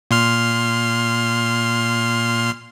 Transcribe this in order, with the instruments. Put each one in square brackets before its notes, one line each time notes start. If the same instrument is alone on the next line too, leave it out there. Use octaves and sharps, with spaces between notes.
[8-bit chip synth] A#2 C6 F6